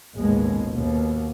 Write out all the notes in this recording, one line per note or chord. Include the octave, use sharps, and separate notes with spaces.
A1 D#2 G#2 B2 G#3
D#2 B2